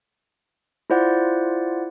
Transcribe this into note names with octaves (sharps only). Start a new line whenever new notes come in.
E4 F4 C5 D5 F#5